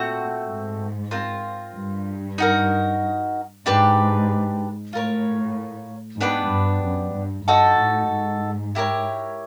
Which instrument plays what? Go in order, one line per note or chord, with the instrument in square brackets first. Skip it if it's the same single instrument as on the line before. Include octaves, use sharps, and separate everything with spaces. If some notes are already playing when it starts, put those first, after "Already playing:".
Already playing: [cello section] A#2 [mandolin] A3 C4 F#4
[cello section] G#2
[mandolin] C4 F4 A#4
[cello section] G2
[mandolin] D#4 F#4 A#4
[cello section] G#2 [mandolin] D4 G4 B4
[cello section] A2 [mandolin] F4 A#4 C#5
[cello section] G#2 [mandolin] B3 D4 G4 B4
[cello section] G2
F#2
G2
[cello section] G2 [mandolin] D#4 F#4 A4
[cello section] A2
G#2
[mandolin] E4 G4 A#4 C#5